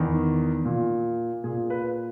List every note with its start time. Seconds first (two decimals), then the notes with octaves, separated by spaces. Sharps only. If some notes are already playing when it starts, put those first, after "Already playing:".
Already playing: E2 D#3
0.65 A#2
1.44 A#2 G#4
1.70 B4